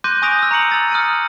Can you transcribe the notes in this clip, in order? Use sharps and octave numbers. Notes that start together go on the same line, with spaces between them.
C6 D6 F#6 G6 A#6 D#7
G#5 C#6 D#6 A#6 D7 F7
D#6 E6
A#5 C#6 C#7 F#7
E6 A6
D#6 F6 A6 C#7 D#7